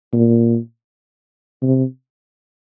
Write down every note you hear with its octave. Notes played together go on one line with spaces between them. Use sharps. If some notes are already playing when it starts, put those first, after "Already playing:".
A#2
C3